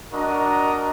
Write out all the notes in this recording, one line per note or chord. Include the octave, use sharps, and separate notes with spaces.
D4 F#4 A#4 D#5 A#5